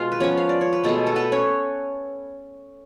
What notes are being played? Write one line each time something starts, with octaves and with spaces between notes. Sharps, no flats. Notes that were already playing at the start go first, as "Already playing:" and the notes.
Already playing: B2 G#3 F4 F5
B4
F3 B3 C#4 C#5
F5
D5
C#5
B4
B2 G#3 A3 B3 A4
A4
B3 B4
C#4 C#5